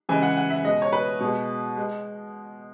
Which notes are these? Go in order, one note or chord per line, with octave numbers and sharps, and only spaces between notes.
C#3 E3 G#3 G#5
F#5
F#5
E5
B2 G#3 D#5
C#5
B4
B2 G#3
G#3